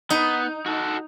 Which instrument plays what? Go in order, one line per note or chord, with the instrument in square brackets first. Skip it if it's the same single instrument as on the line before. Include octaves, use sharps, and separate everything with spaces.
[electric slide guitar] B3 [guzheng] D#4
[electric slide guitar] F#4 A4